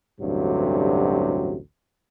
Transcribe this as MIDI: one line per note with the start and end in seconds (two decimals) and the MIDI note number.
0.21 1.56 33
0.21 1.56 38
0.21 1.56 43
0.21 1.56 48
0.21 1.56 54